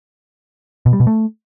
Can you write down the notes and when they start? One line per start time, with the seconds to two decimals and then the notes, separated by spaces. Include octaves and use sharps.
0.86 B2
0.93 G3
1.00 B2
1.07 A3